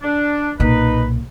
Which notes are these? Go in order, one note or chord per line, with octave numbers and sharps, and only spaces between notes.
D4
B1 A#2 D#4 B4